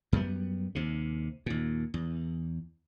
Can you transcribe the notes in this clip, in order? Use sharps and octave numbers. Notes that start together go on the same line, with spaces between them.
F#2 G3 B3
D#2 C3
D#2 A#2
E2